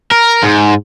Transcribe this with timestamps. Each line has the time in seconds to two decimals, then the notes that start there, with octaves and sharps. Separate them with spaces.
0.11 A#4
0.43 G#2